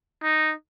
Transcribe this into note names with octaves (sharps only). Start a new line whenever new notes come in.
D#4